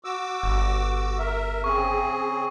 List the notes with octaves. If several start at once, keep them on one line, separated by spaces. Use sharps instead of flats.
F#4 D6 E6
G1
A#4 E5
C#3 C4 G#4 C#6